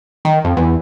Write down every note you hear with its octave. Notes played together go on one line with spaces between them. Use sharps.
D#3
F2
E2